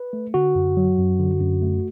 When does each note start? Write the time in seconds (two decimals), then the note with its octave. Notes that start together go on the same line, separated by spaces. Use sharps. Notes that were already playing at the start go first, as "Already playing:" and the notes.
Already playing: B4
0.13 A3
0.34 D3 F#4
0.55 F#2
0.77 F#3
0.98 F#2
1.19 D3
1.41 F#2
1.62 A3